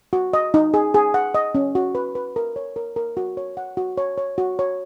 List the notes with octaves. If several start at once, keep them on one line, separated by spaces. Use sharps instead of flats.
F#4
D#5
D#4
G#4
G#4
F#5
D#5
C#4
F#4
B4
B4
A#4
C#5
A#4
A#4
F#4
C#5
F#5
F#4
C#5
C#5
F#4
C#5